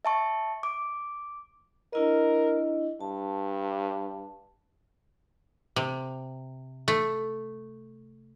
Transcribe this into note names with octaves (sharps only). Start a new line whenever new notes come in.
E5 A5 C#6
D6
D4 E4 A#4 D#5
G2 A5
C3
A3